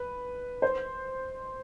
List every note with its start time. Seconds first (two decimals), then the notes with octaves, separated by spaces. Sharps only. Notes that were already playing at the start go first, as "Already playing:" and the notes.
Already playing: B4
0.62 C5